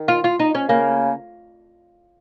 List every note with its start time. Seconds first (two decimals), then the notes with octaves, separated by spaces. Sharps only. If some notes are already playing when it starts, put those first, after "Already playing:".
Already playing: D#3
0.08 F4
0.24 F4
0.39 D#4
0.55 C#4
0.69 C#3 A#3